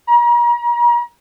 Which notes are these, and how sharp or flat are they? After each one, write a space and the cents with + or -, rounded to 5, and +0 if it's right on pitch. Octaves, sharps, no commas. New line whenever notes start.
A#5 +40